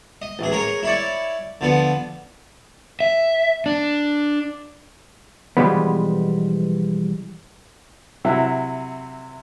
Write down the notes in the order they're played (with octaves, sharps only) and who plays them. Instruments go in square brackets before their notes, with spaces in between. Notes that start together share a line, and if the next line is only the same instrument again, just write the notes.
[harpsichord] D#5
A1 G#4
G#4 A#4 C#5
E4 C#5 D5
D3 F3 B3
[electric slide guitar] E5
D4
[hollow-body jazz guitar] B2 E3 F3 G3 G#3 B3
[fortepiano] C3 F#3 E4